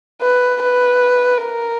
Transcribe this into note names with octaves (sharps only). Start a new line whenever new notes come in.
B4
B4
A#4